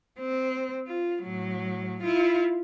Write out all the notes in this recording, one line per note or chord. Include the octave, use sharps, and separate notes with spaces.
C4
F4
A2 F#3
E4 F4